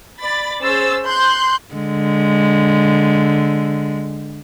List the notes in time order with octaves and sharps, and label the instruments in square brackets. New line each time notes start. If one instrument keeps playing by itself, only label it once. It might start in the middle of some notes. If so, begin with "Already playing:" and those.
[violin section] D5 B5 A6
C#4 G#4 C5 E6 A6
C6 F#6 G6
[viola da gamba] D3 G#3